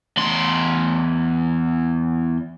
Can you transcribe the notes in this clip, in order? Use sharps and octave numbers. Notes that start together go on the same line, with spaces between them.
E2 C6